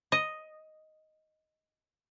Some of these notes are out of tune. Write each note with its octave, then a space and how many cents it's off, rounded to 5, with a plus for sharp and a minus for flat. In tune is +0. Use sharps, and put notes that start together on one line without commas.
D#5 +0